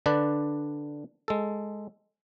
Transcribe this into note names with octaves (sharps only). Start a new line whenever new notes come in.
D3 D4 B4 D5
G#3 A4